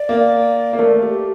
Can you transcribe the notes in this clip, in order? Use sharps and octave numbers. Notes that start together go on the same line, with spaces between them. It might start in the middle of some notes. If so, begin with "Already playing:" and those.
Already playing: D5
A#3
A#3
A3 A#4
G4